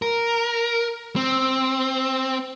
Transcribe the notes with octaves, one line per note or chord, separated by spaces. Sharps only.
A#4
C4